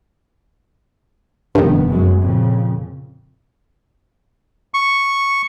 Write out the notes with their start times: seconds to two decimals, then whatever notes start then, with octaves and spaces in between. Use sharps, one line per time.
1.55 F1 G2 D#3 B3
1.89 F#2 F#3 G#3
2.21 F2 A#2 C#3
4.74 C#6